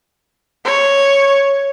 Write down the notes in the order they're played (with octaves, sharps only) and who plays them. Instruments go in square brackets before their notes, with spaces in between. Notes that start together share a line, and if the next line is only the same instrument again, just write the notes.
[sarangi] C#5